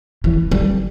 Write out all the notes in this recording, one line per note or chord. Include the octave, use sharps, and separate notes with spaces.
E3
G3